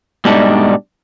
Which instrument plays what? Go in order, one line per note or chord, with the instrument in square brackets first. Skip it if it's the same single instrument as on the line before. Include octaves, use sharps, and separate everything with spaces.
[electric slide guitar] G#2 B2 G3 A3 D4 D#4